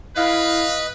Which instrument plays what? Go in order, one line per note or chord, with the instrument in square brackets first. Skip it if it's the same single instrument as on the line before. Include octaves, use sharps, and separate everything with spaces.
[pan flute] E4 [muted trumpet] B4 [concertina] D#5 [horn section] F5